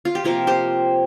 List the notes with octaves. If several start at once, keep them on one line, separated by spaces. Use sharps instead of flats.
F4
G4
C3 F3 A#3 F4 A#4
G4 C5